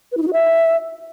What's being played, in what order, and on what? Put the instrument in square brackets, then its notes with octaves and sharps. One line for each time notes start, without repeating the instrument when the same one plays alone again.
[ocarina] B4
E4
D#4
F#4
E5